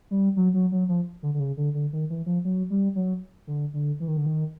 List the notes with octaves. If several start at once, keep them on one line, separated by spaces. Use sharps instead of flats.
G3
F#3
F#3
F#3
F3
D3
D3
C#3
D3
D3
D#3
E3
F3
F#3
G3
F#3
D3
D3
E3
D#3
D3
D#3